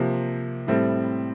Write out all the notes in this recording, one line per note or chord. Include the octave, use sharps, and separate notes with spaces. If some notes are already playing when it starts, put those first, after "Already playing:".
Already playing: C3 F3 A#3
A2 G3 C4 E4 A4